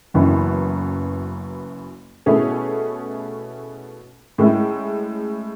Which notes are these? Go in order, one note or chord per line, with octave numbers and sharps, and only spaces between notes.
F#1 F#2 E3 B3
B2 A3 C#4 E4 G#4
A2 G#3 C#4 E4